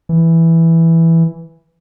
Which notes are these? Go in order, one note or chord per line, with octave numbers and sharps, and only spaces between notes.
E3